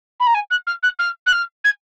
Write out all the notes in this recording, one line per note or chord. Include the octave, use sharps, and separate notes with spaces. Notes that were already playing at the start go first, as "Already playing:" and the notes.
B5
A#5
G#5
F#6
F6
F#6
F6
F#6
F6
G#6